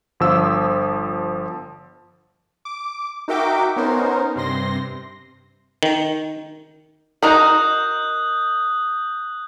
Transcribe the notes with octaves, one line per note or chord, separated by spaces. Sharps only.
G1 F3 E6
D6
D#4 F#4 A#4 E5 G5 D6
B3 C#4 D#4 A#4 C5
G2 C3 C6 A#6
D#3
D#4 F#4 A#4 D#6 F#6 G6